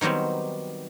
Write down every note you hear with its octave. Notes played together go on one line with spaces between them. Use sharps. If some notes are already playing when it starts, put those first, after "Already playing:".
D#3 F#3 G3 B3 C4